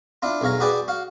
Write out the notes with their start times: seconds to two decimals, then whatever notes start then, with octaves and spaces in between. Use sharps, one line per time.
0.22 D4 E4 F4
0.41 B1 E2 C#5 F5 A#5
0.60 F#4 G#4 B4 D5 G5 G#5
0.88 F#4 F5